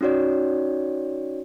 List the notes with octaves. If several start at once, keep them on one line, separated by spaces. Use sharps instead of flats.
C#4 D#4 F#4 C#5 D5